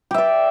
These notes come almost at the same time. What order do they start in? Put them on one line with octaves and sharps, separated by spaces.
G4 E5 D5